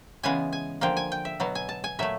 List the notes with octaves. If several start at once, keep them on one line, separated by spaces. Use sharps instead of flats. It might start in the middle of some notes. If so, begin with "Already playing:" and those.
C#3 E3 G#3 B3 G#5
G#5
D3 F3 A#3 G5
G#5
G5
E5
B2 F#3 B3
G#5
A5
G#5
A#2 F#3 A3 E5